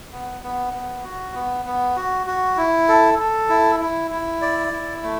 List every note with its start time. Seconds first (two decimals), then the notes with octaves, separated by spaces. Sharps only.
0.12 B3
0.42 B3
0.73 B3
1.04 F#4
1.34 B3
1.66 B3
1.96 F#4
2.27 F#4
2.57 E4
2.88 A4
3.19 A4
3.49 E4
3.80 E4
4.11 E4
4.41 D5
4.72 E4
5.03 A3